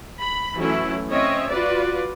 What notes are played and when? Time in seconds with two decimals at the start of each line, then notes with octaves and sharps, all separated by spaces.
0.19 B5
0.56 E3 F#3 A3 C#4 E4
1.10 C4 C#4 C#5 D#5 E5
1.48 F4 F#4 B4 D5